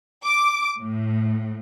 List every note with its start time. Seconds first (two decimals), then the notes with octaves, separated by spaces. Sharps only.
0.25 D6
0.79 A2